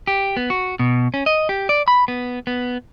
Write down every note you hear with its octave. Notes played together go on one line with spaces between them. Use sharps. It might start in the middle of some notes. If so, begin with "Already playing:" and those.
G4
B3
F#4
B2
C#4
D#5
G4
D5
B5
B3
B3